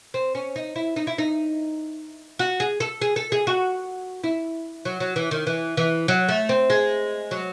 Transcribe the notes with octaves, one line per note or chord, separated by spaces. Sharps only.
C4
C#4
D#4
E4
D#4
E4
D#4
F#4
G#4
A4
G#4
A4
G#4
F#4
E4
F#3
F#3
E3
D#3
E3
E3
F#3
A3
C4
G#3
F#3